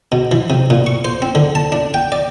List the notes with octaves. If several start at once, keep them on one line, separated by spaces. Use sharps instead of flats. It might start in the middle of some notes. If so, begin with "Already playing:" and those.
B2
E3
C3
A#2
C#6
C5
C4
D3
A5
D4
G5
D5